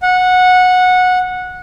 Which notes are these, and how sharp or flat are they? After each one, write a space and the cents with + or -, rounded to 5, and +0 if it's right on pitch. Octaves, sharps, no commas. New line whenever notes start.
F#5 -15